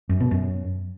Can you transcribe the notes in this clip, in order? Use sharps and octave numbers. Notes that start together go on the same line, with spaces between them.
F#2
B2
F#2